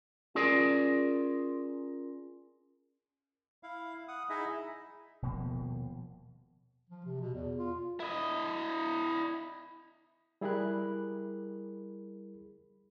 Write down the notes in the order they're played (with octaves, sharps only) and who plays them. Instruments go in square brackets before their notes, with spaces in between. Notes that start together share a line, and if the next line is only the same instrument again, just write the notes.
[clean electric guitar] C#4 F4 G#4 A#4 D5
[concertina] E4 F5
F#5 D#6
D#4 E4 G#4 D#5 E5
[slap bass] D#1 B2 F3 A#3
[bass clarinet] F3
C3
B2
E2
F4
[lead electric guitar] E4 D#5
[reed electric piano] G3 E4 G#4 A#4 B5 F#6